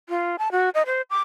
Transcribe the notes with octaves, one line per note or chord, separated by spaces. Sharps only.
F4
A5
F#4
D#5
C5
D6